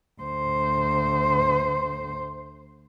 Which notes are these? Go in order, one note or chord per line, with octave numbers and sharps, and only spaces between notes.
D2 C5